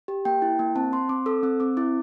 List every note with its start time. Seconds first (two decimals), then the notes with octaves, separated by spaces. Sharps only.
0.08 G4
0.25 A#3 G5
0.42 E4
0.59 A#3
0.76 C4 A5
0.92 C4 C6
1.09 C4 D6
1.26 A4 E6
1.43 C4 E6
1.60 C4 D6
1.77 E4 D6